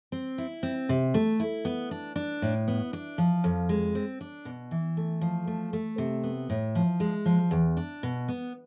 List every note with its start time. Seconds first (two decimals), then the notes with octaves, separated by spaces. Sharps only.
0.12 C4
0.38 E4
0.63 C4
0.89 C3
1.14 A3
1.40 E4
1.65 B3
1.91 D4
2.16 D4
2.42 A2
2.68 B3
2.93 D4
3.18 F3
3.44 F2
3.69 G#3
3.95 C4
4.21 D4
4.45 B2
4.71 E3
4.97 A3
5.21 F3
5.47 A3
5.73 A3
5.98 C3
6.24 B3
6.50 A2
6.75 F3
7.00 G#3
7.25 F3
7.51 E2
7.77 D4
8.03 B2
8.28 B3